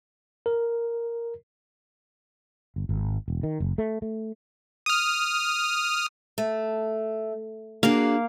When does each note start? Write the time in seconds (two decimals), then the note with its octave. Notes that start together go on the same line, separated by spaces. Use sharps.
0.46 A#4
2.76 G1
2.89 G#1
3.28 E1
3.43 D#3
3.60 F#1
3.78 A3
4.02 A3
4.86 D#6 F6
6.38 A3
7.83 A#3 D4 F#4 G#4 F5